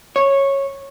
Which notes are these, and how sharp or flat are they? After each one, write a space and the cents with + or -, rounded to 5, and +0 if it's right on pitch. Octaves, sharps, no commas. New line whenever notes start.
C#5 -10